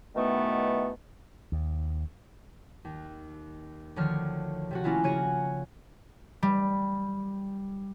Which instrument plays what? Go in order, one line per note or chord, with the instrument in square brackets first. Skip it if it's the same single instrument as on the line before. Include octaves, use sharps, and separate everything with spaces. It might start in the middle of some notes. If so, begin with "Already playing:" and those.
[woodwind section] B2 D#3 E3 A3 B3
[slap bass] D#2
[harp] D#2
D2 D3 D#3 F3 C#5 F6
C3 F3 F#4
A3 A#3 C#4 E4 F4
C#3 F#4 C#5 G#6 D#7
G3